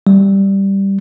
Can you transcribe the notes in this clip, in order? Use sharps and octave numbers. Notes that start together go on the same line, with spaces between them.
G3